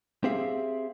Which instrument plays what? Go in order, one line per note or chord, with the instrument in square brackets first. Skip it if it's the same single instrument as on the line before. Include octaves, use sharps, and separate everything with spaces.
[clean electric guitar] C4 G4 G#4 E5 F5